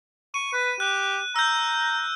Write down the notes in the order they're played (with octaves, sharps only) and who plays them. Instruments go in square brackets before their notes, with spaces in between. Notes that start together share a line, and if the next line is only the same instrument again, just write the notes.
[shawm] C#6 [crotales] D#7
[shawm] B4
[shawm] G4 [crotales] F#6
[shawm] A#5 [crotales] E6 G6